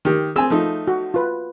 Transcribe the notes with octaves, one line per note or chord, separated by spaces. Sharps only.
D#3 G4
C4 G#4 G#5 E6
F3 A3 D#4
F#4
F4 B4